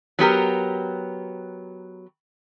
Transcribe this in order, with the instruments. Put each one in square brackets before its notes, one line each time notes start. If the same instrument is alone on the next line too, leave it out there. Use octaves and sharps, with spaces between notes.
[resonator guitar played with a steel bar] F#3 B3 G4 A#4